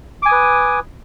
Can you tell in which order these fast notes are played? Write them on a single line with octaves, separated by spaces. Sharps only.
D6 G#5 D#6 B4